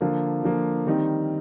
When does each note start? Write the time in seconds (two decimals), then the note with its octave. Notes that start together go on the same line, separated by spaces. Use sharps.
0.01 D3 F3 A#3
0.44 D3 F3 A#3
0.87 D#3 G3 C4 D#4